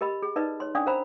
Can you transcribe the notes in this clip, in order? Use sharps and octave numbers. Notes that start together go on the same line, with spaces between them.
G4 A#4 D#5 B5
G#4
D#4 A#4 B4 D5 D#5
C#5 C6
C#4 D4 D5 F5 C#6 D#6
A#4 C5 F5 A#5 B5